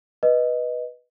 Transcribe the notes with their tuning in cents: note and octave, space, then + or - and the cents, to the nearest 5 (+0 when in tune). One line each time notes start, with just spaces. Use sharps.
B4 -10 D#5 +0